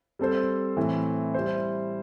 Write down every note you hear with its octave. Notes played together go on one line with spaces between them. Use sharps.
G3 C4 A4 C5
A2 E3 C4
G3 E4 C5